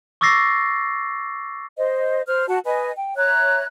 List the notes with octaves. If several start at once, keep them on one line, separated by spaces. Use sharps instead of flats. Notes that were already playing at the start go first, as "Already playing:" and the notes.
C#6 D6 E6 A6 A#6 C7
C5 D#5
C5 F6
F#4 F#5 A5
B4 D#5 G#5
G5
C#5 E5 A#5 F#6